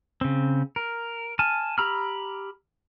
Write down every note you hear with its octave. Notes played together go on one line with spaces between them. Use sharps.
C#3 C4
A#4
G#5 A5 F6
G4 A#5 B5 E6 F6